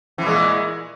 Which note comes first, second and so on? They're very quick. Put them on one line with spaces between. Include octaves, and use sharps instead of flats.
E3 A#2 G#3